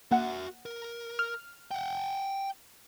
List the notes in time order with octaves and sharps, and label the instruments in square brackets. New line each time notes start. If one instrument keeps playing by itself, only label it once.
[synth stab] A#3 F#5 [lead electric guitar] F#4 E5
[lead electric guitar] A#4
[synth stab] F6
[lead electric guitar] F#5 G5